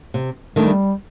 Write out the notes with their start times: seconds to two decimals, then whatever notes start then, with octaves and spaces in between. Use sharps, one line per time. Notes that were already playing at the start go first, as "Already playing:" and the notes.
0.14 C3
0.55 D#3 G3 A3 D4